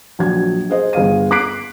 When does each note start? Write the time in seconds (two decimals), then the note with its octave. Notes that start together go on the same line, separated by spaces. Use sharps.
0.19 A#1 F#3 G#6
0.70 G#4 C5 D#5
0.93 G1 G#4 F5 D#7
1.31 D6 F#6 B6 C7 D7